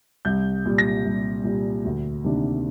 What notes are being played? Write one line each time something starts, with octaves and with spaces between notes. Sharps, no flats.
C2 G6
A#2 G3
A#6
C2
A#2 G3
D2
C3 D#3 A#3 D4